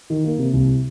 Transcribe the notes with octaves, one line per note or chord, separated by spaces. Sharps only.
D#3
A#3
C3
C2